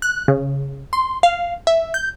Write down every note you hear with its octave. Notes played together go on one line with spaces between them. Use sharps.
F#6
C#3
C6
F5
E5
G6